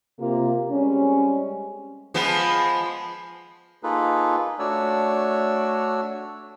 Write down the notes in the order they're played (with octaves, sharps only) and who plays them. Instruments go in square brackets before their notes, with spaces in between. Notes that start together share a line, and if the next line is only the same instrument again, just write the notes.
[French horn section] C3 A#3 F4
G3 G#3 C4 C#4
[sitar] F3 G#3 B3
[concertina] A#3 D#4 F4 G#4 A4 B4
A3 D4 F#4 C#5 D5 E6